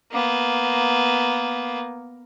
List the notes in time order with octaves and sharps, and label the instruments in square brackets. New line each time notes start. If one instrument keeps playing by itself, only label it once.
[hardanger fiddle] A#3 B3